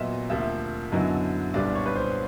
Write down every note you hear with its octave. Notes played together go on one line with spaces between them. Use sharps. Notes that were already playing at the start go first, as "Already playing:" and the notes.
Already playing: A#2 F#3 B3 D#5 E5
D2 C3 F3 A#3 E5
F#2 D3 F#3 B3 E4 D#5
C2 A#2 G3 B3 D4 D5
C#5
B4
C5